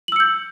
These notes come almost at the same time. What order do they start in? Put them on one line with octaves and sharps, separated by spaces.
F#7 E6 C#7 G6